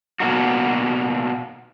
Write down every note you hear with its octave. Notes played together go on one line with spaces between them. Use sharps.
B2 A#3 D#4 F#4